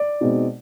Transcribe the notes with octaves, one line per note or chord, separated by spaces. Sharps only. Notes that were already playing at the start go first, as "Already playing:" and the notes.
Already playing: D5
B2 G#3 C4 D#4